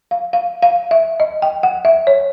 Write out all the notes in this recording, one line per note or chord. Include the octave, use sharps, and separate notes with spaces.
F5
F5
F5
E5
D#5
G5
F#5
E5
C#5